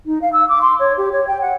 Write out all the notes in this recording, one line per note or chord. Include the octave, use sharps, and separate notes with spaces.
D#4
F5
E6
D6
C6
C#5
G4
C#5
G5
F#5